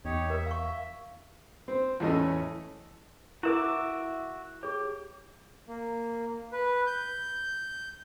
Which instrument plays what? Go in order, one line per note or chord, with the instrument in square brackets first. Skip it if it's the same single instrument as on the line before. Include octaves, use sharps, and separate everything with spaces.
[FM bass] E2 [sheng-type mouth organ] D#4 G4 C#5
[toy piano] A#4 [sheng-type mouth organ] E5
[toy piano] F5 C#6
F5
[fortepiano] C4
E2 A2 A3 C#4 D#5
[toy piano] E4 A#4 [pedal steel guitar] F#4 E5 D6
[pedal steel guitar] G4 [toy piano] G#4 C#5
[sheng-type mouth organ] A#3
B4
G6